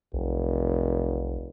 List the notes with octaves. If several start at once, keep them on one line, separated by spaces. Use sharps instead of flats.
F1 B1